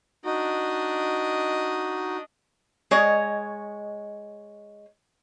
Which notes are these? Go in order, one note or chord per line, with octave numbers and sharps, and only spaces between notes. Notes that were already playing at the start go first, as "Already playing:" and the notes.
D4 D#4 F#4 D#5
G#3 C#5 D#5